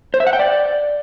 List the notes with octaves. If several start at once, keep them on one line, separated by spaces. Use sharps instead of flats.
C5
E5
F#5
G5
D5